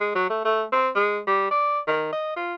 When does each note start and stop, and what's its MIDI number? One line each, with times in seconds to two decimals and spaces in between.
0.01 0.13 56
0.15 0.28 54
0.30 0.40 57
0.45 0.64 57
0.72 0.90 60
0.96 1.20 56
1.27 1.50 55
1.51 1.79 74
1.87 2.09 51
2.13 2.32 75
2.36 2.55 65